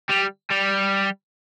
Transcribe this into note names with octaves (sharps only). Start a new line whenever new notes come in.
G3
G3